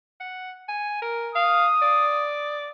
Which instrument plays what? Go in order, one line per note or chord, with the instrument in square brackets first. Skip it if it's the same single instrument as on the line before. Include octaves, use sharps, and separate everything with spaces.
[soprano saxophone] F#5
G#5
A#4
[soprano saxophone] F5 [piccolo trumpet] D#6
[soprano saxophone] D5